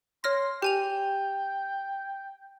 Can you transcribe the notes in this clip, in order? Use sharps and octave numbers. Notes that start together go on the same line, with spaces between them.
C#5 C6 F6 A#6
G4 G5 G#5 F7